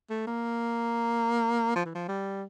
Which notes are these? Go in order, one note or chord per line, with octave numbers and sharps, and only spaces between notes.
A3
A#3
F3
E3
F3
G3